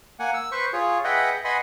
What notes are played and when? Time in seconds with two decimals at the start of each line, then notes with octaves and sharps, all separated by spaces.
0.19 A#3 F#5 G#5
0.34 E6
0.52 B4 C5 C#6
0.73 F4 G#4 C#5
1.04 G#4 B4 D#5 E5 F#5 G5
1.45 B4 D#5 F#5 G#5 B5 C6